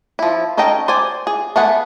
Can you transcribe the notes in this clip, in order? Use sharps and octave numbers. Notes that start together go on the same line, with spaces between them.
F3 E4
C#4 D#4 A4 D#5 G5
C5 D5 G#5
G#4
A3 B3 G#4 F#5